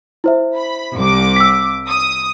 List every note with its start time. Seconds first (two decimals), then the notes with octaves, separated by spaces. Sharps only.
0.24 E4 C5 E5
0.56 B5
0.96 C2 D6
1.36 E6 B6
1.88 D#6